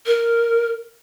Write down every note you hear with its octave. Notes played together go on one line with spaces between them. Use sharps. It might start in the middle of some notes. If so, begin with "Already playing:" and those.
A#4